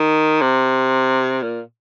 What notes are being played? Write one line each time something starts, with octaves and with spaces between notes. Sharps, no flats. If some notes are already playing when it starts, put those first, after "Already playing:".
Already playing: D#3
C3
A#2